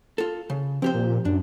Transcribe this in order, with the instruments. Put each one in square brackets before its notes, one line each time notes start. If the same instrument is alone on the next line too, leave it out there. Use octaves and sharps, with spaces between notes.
[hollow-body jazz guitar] F4 A4
C#3
[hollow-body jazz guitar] F3 G4 C5 [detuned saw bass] C4
[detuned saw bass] A#2
[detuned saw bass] F#2 [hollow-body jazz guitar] D4